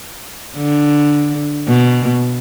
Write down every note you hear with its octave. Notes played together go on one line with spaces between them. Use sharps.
D3
B2